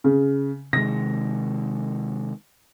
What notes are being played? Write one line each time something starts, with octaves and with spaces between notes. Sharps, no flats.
C#3
C3 D#3 G#3 A#6